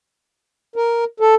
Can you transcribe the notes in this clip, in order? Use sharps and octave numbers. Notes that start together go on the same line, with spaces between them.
A#4
A4